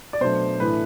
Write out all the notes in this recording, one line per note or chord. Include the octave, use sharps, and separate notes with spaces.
D5
B2 F#3 A3 D4 C5
A2 E3 A3 D4 B4